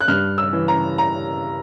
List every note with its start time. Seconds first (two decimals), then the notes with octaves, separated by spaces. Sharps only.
0.01 F#6
0.08 G2 F6
0.38 E6
0.53 E3
0.68 A#5
0.98 A#5